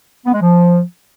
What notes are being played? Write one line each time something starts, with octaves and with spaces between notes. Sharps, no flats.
B3
G#3
F3